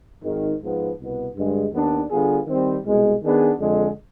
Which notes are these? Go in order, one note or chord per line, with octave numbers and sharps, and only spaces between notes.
G#1 G#2 D#3
G#2 F3 B3
C2 B2 B3
G2 D3 G#3
D#2 D#3 B3 D4
D3 G3 B3 F4 G#4
D#3 G3 C4
C2 B2 G#3
D#3 B3 D4 G#4
F2 D3 G#3